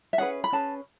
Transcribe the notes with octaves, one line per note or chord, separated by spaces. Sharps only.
E5
C#4 G#4 B4 F#5
B5
C#4 G#4 B4 A5